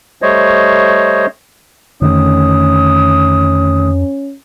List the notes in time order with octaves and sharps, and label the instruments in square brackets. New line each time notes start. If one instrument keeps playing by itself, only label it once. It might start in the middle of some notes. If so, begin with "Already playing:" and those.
[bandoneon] G3 A3 C5 C#5 D#5
[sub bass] F2 [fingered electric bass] D3 D#3 A3 [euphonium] C#4 [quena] D#6